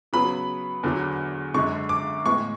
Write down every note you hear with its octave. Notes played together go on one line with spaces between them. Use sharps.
C#3 F#3 B3 B5
E2 D3 F#3
F#2 D3 G#3 C#6
D6
A2 E3 G#3 B3 C#6